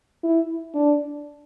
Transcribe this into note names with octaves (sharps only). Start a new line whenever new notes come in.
E4
D4